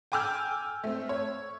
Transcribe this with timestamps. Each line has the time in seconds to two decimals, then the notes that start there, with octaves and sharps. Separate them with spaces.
0.12 G5 G#5 D6 E6 F6 G6
0.84 A3 C4
1.09 C#5